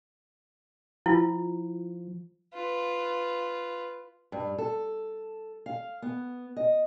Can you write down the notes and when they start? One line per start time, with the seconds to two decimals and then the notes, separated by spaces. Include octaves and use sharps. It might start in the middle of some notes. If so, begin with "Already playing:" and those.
1.06 F3 E4 F4
2.54 F4 B4
4.32 G2
4.58 A4
5.66 F5
6.02 B3
6.56 D#5